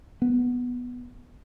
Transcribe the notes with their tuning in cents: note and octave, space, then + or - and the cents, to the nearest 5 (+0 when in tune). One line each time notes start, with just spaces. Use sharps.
B3 -5